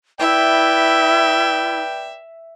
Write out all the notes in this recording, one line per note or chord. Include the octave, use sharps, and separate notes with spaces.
E4 B4 D5 E5 G5